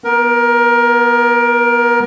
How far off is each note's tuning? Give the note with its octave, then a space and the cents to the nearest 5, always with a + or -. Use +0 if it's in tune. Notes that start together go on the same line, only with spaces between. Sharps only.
B3 -20 A#4 +20